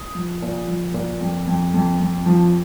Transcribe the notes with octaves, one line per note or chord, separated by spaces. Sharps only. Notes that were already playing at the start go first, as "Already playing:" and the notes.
Already playing: D#6
F3
A#2
F3
A#2
F2
F2
F2
F2
F3